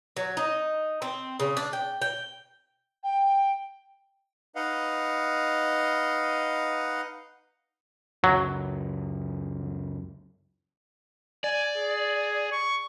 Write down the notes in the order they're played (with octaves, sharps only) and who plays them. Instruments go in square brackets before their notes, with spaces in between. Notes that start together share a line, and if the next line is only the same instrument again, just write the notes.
[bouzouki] F#3
D#4
C4
C#3
D4
G5
G5
[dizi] G5
[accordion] D#4 B4 D#5 F5 F#5
[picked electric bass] C#2 F#2 [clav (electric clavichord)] F#3
[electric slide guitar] D5 [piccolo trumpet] G#5
[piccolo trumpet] G#4
C#6